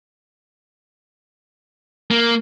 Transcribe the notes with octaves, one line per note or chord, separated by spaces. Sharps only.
A#3